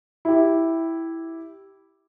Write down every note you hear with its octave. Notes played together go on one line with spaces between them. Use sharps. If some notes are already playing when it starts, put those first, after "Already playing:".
E4 G4